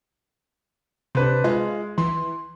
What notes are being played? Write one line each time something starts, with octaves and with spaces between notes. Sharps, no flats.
C3 D4 B4 C5
G#3 F4
E3 C6